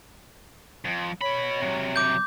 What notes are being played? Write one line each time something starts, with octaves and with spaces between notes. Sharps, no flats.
F2
B2 C#5 B5
C3 F#3
D6 G6